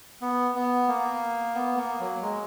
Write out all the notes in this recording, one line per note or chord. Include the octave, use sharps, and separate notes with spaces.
B3
B3
A#3
B3
A#3
F#3
G#3